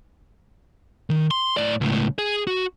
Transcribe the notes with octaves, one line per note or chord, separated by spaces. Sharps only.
D#3
C6
A2 D5
C#2 A2
G#4
F#4